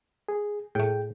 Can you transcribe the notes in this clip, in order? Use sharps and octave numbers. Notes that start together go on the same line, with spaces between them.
G#4
A2 A3 G#4 G5